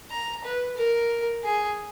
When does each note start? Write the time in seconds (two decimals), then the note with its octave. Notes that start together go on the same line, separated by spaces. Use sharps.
0.11 A#5
0.44 B4
0.77 A#4
1.43 G#4